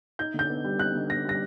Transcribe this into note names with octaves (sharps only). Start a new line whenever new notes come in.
D#4 G6
D3 G6
B3
G3
D#4 F#6
D3
B3 A#6
G3 A#6